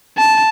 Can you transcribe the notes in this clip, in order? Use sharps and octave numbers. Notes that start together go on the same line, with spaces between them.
A5